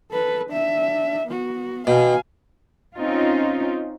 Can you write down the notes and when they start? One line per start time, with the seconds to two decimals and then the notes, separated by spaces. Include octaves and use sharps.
0.11 A4 B4
0.50 D4 E5
1.27 B3 F#4
1.87 B2 F5 G#5
2.95 C4 C#4 D#4 F4